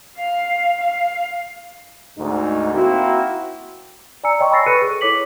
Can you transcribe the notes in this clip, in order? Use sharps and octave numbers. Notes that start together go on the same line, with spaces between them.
F5
F5
D2 G#2 D#4
A#3 C4 E4 F#4
D5 G#5 A#5 E6 C#7
C#5 D#5 G5 C6 C#6
B5 C#6 E6 A6 A#6 C7
A4 B4 F#6 C#7 D#7
G#4
E4 A4 C#5 D6 B6 F#7